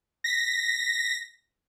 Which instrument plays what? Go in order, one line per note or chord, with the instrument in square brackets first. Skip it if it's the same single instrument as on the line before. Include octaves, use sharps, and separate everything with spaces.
[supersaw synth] A#6 B6